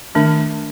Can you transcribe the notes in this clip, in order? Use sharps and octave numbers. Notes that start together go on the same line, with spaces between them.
D#3 A3 D4